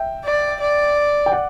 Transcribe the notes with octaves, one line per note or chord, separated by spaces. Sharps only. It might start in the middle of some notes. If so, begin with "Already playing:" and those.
Already playing: E5 G5
D5
D5
G5
D5 F#5